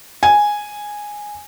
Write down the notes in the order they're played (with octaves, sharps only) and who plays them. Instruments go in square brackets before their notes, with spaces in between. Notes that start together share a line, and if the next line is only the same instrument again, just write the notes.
[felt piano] G#5